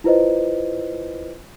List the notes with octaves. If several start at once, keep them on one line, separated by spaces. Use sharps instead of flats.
E4 F4 B4 C5 D#5